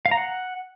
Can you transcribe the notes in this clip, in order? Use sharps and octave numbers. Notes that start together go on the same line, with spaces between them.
F5
A#5
F#5